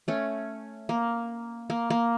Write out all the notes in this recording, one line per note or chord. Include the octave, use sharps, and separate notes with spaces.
A3 C#4
A#3
A#3
A#3